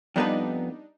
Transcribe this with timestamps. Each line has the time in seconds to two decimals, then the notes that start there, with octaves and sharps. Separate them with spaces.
0.16 F2 G3 B3 D4 D#4 B4